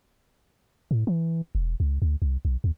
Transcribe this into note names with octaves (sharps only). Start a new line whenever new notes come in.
A2
E3
E1
C#2
D2
C2
B1
D#2